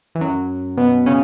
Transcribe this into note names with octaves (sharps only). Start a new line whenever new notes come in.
E3
F#2 F#3
B2 B3
C#3 C#4